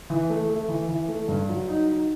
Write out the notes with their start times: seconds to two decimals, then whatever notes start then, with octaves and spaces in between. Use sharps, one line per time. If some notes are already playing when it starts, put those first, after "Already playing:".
0.10 E3
0.30 A3
0.50 A3
0.68 E3
0.89 E3
1.08 A3
1.28 G2
1.49 F#3
1.68 D#4
1.88 D#4